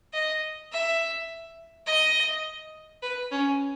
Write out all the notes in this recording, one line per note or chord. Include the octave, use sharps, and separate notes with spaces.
D#5
E5
D#5
B4
C#4